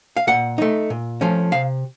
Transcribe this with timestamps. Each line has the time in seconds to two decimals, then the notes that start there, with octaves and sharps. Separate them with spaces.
0.17 F5
0.27 A#2 F#5
0.58 A3 D#4
0.90 A#2
1.21 F3 A3 C#4
1.52 C3 F5